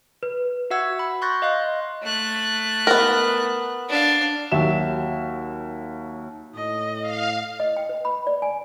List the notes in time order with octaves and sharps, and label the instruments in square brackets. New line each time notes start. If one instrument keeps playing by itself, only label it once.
[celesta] B4
[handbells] F#4 E5 F#5 E6 G#6
B5
C6 C#6 F#6 G6 A6 A#6
D#5 F5 C6 F#6
[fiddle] A3 F#6
[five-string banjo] B3 A#4
[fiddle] D4 F5
[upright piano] D#2 F#3 E5 E7
[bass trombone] A2 [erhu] D#5
[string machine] F5
[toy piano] D#5
G5
B4
B5
D5
G#5